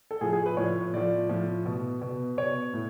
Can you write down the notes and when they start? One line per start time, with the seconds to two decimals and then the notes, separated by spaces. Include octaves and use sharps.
0.11 A4
0.21 A2 F3 G#4
0.33 G#4
0.46 B4
0.57 A2 F3 C#5
0.93 A2 F3 D5
1.29 A2 F3
1.66 B2
2.02 B2
2.38 B2 C#5
2.74 A2